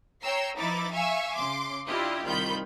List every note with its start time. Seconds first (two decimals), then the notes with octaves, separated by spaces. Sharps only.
0.22 C#5 G5 A#5 E6 C7
0.58 F3 D#4 E4 B4 D6 A6
0.93 E5 F5 G#5 C#6 E6
1.35 C#3 C6 D6
1.87 D4 E4 F4 G4 D#5
2.25 C2 D#3 F4 B5 G6